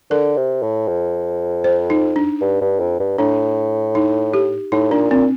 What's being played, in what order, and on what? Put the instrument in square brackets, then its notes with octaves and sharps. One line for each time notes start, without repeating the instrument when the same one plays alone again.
[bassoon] D3 [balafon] A#4
[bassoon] C3
A2
F2
[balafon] C5
D#4
D4
[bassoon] G2
G2
F2
G2
[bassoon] A2 [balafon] D4
[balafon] D#4
G4
[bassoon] A2 [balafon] D#4
[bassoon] A#2 [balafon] D4
[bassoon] A#2 [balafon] C4